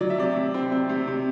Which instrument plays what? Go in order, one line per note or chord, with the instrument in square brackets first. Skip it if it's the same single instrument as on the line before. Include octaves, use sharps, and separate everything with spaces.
[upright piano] F#3 D5
E5
C3 D5
C3
C4
C4
C3
C3